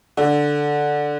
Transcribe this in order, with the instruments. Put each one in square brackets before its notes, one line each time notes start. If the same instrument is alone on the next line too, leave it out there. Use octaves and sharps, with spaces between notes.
[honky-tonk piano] D3